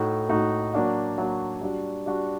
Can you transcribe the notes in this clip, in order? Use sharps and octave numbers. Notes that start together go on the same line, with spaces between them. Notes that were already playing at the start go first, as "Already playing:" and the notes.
Already playing: A2 A3 D#4 F#4
A2 A3 D#4 F#4
F#3 A#3 D4 F#4
F#3 A#3 D4 F#4
G3 D4 F#4
G3 D4 F#4